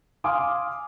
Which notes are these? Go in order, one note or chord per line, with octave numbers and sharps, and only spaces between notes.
F5 G#5 C6 D6 D#6 F6